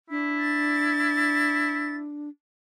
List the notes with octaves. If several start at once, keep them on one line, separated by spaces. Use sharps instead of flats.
D4 E4
A6